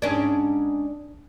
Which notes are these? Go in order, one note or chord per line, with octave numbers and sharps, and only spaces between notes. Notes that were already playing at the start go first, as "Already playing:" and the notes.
G#2 C#4 D4